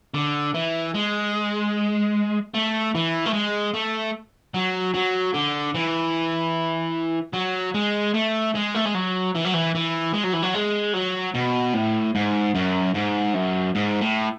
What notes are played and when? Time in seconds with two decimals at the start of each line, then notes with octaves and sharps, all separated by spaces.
0.14 D3
0.54 E3
0.94 G#3
2.54 A3
2.95 E3
3.26 A3
3.34 G#3
3.74 A3
4.54 F#3
4.94 F#3
5.34 D3
5.74 E3
7.34 F#3
7.75 G#3
8.14 A3
8.55 G#3
8.75 A3
8.85 G#3
8.94 F#3
9.35 E3
9.45 F#3
9.54 E3
9.75 E3
10.14 G#3
10.24 F#3
10.34 E3
10.43 F#3
10.55 G#3
10.94 F#3
11.35 B2
11.74 A2
12.15 G#2
12.55 F#2
12.95 G#2
13.34 F#2
13.75 G#2
14.01 A2